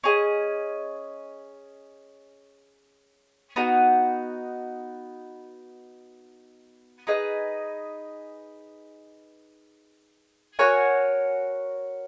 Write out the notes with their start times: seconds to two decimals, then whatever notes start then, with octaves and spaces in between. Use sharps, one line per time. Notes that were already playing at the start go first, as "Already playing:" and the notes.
0.04 C#4 G#4 D#5
3.56 B3 D#4 F#4
7.07 D#4 G#4 B4 D#5
10.59 F#4 A#4 C#5 G#5